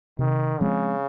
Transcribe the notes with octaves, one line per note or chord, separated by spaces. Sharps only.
C3 D#3
C#3 F3 G#3 C4